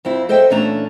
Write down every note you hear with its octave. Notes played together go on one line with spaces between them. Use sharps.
F2 C4 E4
A4 C5 D#5 E5 F#5 G5
A#2 E3 A3 C#4 D4 A#5